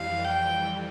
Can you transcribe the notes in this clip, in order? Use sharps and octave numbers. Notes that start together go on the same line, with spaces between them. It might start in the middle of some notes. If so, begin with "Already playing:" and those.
Already playing: F2 E3 G3 F5
G5